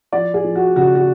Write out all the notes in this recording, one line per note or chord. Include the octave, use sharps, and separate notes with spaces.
F3 D5
G#4
F3
F#4
C#3 F#4
F#4